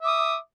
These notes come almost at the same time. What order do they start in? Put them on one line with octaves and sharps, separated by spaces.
E5 D6 D#6